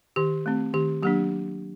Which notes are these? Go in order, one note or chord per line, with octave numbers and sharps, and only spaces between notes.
D#3 G4
A3 C4
D#3 G4
F#3 A#3 D4 G4